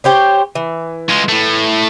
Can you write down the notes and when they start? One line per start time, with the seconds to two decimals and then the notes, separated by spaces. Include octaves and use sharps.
0.04 G4 C5 C#5
0.55 E3
1.09 G#3 F4
1.29 A2 A3